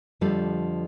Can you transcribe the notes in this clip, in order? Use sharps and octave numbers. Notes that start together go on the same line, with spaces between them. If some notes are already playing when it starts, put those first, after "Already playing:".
F2 D3 F3 G3 A3 A4